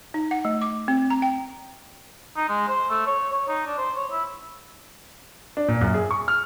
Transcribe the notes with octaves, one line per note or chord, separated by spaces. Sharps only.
D#4
F#5
A3
D6
C4
A#5
G5
D#4
G#3
C5
A3
C#5
C#5
D#4
D4
C5
C#5
E4
D4
A#2
F#2
G#4
C#6
F6